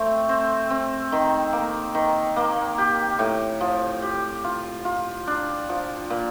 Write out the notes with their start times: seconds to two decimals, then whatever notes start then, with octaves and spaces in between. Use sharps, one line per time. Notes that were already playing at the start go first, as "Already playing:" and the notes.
Already playing: A3 C4
0.29 C4
0.70 C4
1.12 D#3
1.53 A#3
1.95 D#3
2.36 A#3
2.78 G4
3.19 A2
3.61 F3
4.02 G4
4.44 F4
4.85 F4
5.27 D4
5.69 F3
6.10 A#2